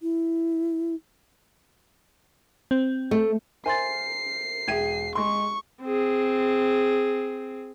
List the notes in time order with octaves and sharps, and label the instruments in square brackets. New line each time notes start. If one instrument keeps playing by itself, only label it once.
[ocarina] E4
[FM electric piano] C4
[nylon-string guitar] A3
[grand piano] A#4 C5 E5 [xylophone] G#5 C6 A6 [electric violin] C7
[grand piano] E1 G5 D#7 [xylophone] G#4 E5 G#6
[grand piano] G#3 C6 [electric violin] C#6
[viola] C4 G#4